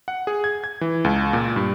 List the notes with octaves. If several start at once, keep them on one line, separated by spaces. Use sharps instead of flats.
F#5
G#4
G#6
G#6
E3
C#2
A#2
G2